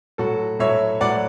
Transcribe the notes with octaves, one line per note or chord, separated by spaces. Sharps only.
A2 F#3 F#4 A4
A2 F#3 C#5 E5
A2 F#3 D5 F#5